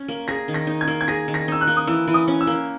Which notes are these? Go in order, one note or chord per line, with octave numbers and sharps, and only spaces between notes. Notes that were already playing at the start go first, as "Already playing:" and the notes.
Already playing: C#4
A#3
G#4 A#6
D#3
A#6
D#4
G#6
A#3
G#6
G#4 A#6
D#3
A#6
D#4 E6
F#6
A#3
D#6
E3 E6
E3
D#6
C#4
E6
A#3